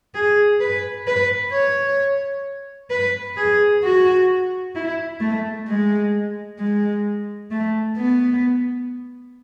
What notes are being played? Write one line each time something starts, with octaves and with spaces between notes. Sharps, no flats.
G#4
B4
B4
C#5
B4
G#4
F#4
E4
A3
G#3
G#3
A3
B3